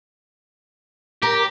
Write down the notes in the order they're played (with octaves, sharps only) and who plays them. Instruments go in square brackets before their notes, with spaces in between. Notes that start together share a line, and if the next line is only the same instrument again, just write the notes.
[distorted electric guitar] G4 [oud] A#4